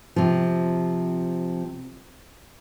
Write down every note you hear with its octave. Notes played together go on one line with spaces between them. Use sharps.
C3 F3